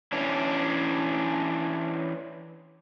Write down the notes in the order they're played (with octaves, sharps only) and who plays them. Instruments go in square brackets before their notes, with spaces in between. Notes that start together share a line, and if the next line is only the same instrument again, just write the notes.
[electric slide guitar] E3 C#4 D4